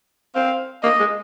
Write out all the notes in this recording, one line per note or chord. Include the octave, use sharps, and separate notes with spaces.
C4 F5
A#3 D#5
G#3